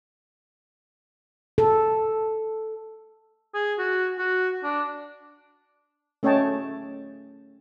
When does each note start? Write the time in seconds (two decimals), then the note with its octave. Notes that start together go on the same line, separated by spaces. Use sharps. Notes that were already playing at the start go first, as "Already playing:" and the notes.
1.58 A4
3.54 G#4
3.79 F#4
4.18 F#4
4.63 D4
6.23 A3 C#4 C#5 D#5 G5 A5